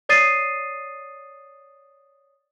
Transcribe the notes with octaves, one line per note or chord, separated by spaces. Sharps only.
C#5 D5 D#6 A6 C7 D#7